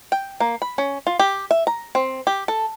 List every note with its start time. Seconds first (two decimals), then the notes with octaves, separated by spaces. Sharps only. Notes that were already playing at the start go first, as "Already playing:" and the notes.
0.12 G5
0.40 A#3
0.62 B5
0.78 C#4
1.07 F4
1.19 G4
1.51 E5
1.67 A#5
1.95 C4
2.27 G4
2.48 A4